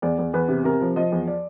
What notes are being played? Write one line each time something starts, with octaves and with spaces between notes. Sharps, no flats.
E2 D5
E2
E2 B4
C3
C3 A#4
F3
F3 D#5
E2
D5